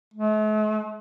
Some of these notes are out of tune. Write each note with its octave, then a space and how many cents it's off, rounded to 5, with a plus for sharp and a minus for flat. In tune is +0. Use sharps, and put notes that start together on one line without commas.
A3 -45